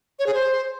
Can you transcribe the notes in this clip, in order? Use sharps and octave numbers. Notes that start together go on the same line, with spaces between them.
C#5
G#4
C5